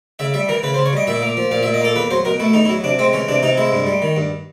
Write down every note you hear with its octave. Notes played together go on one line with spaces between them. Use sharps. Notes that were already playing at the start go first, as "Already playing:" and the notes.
C#3 E5
G3 E5
E3 A#4
C#3 B4
C5
C#3
C#5
G3 D#5
A#2 E5
A#3
F3
A#2 F5
E5
A#2
D#5
A#3 A4
E2 B4
F#3 C5
B2 A#4
A3 E4
E2 D#4
E4
F#3
C3 D4
G#3 C4
E3 C#4
C3 D4
C3 D#4
G#3 E4
G2
G3
D#3
G2